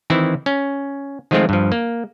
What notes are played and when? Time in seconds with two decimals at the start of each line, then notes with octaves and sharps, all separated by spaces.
0.10 D#3 E3 C4 E4
0.46 C#4
1.31 D#3 F3 G#3 A3 C4 F4
1.49 G2 F3
1.72 A#3